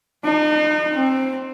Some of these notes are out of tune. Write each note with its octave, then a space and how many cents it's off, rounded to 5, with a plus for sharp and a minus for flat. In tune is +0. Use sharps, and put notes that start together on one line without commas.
D#4 -35
C4 +10